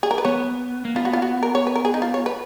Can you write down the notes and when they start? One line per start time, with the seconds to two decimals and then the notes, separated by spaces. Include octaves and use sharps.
0.03 G#4
0.11 A#4
0.18 B4
0.25 B3 C#5
0.85 A#3
0.96 B3 F4
1.05 F#4
1.13 F4
1.22 F#4
1.43 A#4
1.55 C#5
1.67 B4
1.76 A#4
1.85 G#4
1.94 D#4
2.02 F4
2.14 C#5
2.26 B4